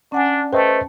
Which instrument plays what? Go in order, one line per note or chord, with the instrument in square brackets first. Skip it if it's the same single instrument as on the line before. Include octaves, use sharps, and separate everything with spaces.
[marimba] C#4 F#5 G#5 [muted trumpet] D4
[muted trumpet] A3 [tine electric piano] B4 C5 D#5 [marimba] G5 A5